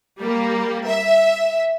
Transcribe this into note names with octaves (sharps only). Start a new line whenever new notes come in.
G3 A#3
E5